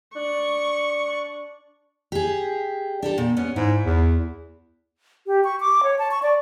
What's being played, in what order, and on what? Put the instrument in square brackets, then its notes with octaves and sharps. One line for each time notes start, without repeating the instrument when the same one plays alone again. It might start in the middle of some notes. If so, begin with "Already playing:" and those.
[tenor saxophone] D4 [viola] C#6
[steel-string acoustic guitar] G4 G#4
D4 G4 A4
A#2
B3 C#4
[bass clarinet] G#2 [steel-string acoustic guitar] E4
[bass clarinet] E2
[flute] G4
C#6
D6
C#5
A5
C#6
D5